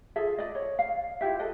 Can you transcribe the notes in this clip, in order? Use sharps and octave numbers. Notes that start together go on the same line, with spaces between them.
F4 G#4 A4 E5
D5 D#5
C#5
F5
E4 F4 G4 E5
A4 B4 D#5